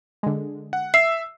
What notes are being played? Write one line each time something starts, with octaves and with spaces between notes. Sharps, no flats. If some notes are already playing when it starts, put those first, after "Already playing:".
D3 G#3
F#5
E5 E6 C7